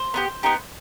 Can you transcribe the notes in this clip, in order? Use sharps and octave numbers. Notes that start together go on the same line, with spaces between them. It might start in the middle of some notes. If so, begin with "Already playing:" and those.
Already playing: C5
B3 D#4 G4
B3 D#4 G4